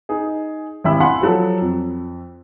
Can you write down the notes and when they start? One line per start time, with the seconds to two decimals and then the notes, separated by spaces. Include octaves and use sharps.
0.09 D#4 G#4
0.84 G#1 C3 E4 B5 E6
1.00 F5 F#5 G#5 B5 C6
1.21 F3 F#3 A4
1.61 F2